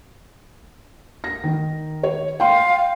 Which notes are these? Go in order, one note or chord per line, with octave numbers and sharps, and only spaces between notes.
A#6
D#3
C#5
F5 G5 C6